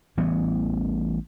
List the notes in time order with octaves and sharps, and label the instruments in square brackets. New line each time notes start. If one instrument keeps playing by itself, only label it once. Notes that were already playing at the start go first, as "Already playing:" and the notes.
[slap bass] A1 E3 G3 B3